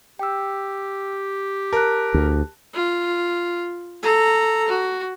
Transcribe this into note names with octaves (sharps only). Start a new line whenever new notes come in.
G4 G5 E6
A#4 A5 F#6
D2
F4
A4 A#5
F#4